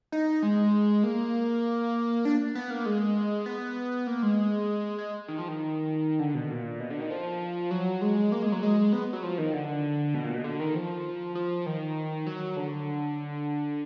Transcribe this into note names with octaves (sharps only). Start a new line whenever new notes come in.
D#4
G#3
A#3
D4
B3
A#3
G#3
B3
A#3
G#3
G#3
D#3
F3
D#3
D3
B2
A#2
B2
D3
D#3
F3
F#3
G#3
A#3
G#3
F#3
G#3
B3
F#3
F3
D#3
D3
B2
A#2
B2
D3
D#3
F3
F3
D#3
F#3
D3